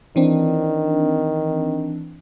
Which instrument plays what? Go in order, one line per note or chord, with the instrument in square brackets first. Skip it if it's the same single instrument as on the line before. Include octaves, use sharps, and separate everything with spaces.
[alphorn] D#3 [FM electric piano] E3 C4 D4